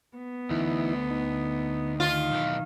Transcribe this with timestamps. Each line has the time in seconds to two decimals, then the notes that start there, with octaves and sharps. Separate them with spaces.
0.16 B3
0.50 D2 E3 D#4 E4
1.10 D#4
2.00 D#3 F4
2.32 B1 E3